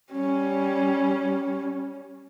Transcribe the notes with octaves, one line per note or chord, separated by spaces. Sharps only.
G3 C#4